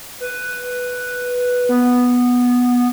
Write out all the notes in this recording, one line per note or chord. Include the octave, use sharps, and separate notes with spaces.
B4
B3